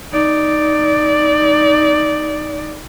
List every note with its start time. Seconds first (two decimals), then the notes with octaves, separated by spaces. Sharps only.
0.12 D#4 D5